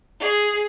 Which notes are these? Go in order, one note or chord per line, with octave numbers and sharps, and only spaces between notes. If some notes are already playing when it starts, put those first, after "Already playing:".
G#4